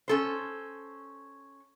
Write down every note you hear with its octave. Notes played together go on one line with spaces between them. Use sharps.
C#4 A4 C5